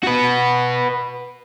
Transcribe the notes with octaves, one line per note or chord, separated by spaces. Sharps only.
F#4 B4